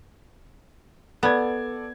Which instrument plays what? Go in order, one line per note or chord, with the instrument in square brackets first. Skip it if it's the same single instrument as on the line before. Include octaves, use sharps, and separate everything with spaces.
[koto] B3 [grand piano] A4 D5 G#6